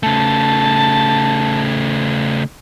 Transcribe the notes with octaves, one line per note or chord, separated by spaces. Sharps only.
C#3 A3 A5